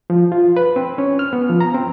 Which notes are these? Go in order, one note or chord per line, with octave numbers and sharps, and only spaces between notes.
F3
F4
B4
C4
C#4
F6
B3
F3
A#5
C4